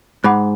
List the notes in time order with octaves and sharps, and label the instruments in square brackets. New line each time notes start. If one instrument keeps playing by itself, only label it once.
[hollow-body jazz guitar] G#2 [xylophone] F#5 B5 D6 F#6